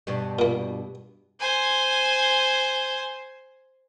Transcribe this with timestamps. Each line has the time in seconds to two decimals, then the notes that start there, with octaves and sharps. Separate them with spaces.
0.07 G2 B2 G3
0.39 A#2 A#3
1.40 C5 G#5